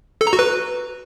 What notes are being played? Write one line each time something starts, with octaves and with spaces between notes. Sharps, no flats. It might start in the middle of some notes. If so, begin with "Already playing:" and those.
A4
A#5
F#4
B4